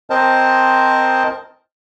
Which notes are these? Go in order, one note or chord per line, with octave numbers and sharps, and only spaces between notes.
C4 A#4 C5 D#5 A5